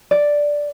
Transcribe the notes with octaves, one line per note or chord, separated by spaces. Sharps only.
D5